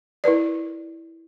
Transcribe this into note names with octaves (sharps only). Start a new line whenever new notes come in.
E4 A#4 B4 D5